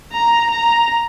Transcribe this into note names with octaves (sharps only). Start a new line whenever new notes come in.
A#5
A#5